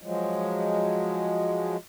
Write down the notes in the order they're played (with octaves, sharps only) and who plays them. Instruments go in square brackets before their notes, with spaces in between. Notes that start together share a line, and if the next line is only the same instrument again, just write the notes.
[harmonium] F3 F#3 G#3